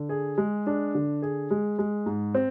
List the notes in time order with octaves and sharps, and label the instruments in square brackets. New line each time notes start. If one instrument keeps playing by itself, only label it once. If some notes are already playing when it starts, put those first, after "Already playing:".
Already playing: [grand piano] D3
G#4
G#3
D4
D3
G#4
G#3
G#3
G#2
C4